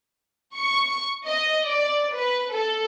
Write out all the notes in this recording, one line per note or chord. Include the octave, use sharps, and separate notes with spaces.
C#6
D#5
D5
B4
A4